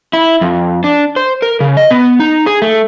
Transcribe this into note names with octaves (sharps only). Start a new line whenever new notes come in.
E4
F2
D4
C5
A#4
C#3
D#5
B3
D#4
G#4
A3